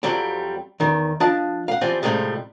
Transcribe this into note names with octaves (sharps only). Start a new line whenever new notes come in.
F2 F#3 G3 C4
E2 D#3
F3 D4 D#5 A5
F5 F#5
E3 F3 G3 C4
A2 C3 D#3 F3 G3 G#3